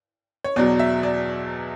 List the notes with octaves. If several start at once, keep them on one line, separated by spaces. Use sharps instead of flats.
C#5
E2 B2 F#3 D5
E5
D5